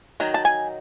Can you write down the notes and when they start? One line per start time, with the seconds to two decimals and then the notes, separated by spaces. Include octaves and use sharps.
0.20 D#3 F#3
0.34 A5
0.45 G#5